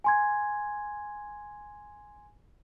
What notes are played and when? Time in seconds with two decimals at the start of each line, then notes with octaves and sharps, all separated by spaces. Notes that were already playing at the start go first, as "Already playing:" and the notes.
0.04 G#5 C6 G#6